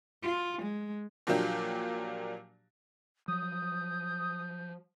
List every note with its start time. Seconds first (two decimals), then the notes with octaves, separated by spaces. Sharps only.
0.23 F4
0.62 G#3
1.27 A#2 F3 F#3 A#3 D4 G4
3.28 F3 F#3 D#6 G6